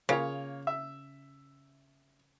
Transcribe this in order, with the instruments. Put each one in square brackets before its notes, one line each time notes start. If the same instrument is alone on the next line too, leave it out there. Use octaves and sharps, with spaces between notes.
[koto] C#3 [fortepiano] A#3 F4 C#5
[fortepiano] E5